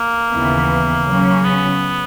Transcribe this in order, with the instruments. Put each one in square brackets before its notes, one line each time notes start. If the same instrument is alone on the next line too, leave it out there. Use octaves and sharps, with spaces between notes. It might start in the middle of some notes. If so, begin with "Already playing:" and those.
Already playing: [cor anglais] A#3
[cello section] D#2 C#3 E3 B3
C#3 F#3 C#4
[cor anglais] B3